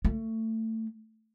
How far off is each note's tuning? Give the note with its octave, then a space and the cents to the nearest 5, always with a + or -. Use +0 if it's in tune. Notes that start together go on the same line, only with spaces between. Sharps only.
A3 +25